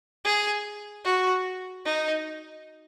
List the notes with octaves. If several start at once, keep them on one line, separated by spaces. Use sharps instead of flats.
G#4
F#4
D#4